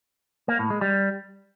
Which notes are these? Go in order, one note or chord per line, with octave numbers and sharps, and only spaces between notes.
A#3
A2
G#3
G3